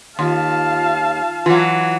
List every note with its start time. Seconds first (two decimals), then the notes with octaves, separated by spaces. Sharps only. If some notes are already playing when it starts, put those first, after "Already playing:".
0.19 D#2 F4 F5 A5
1.46 E3 F#3 F4